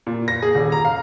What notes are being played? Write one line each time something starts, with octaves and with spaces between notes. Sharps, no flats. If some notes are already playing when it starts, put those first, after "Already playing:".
A#2
A#6
G#4
D#1
A#5
F5